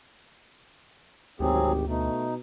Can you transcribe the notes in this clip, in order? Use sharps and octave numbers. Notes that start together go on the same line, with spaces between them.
G#1 D2 F#3 C4 G4 G#4
B2 A3 D#4